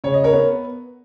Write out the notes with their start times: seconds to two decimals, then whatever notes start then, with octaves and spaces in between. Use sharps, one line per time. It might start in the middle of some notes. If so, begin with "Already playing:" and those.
0.04 C#3 C#5
0.14 D#5
0.24 A#4 C#5
0.33 B3